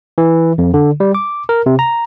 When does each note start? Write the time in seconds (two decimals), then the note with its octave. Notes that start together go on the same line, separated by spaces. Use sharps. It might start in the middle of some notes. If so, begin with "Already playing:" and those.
0.18 E3
0.58 F2
0.74 D3
1.00 G3
1.15 D6
1.49 A#4
1.66 C3
1.79 A#5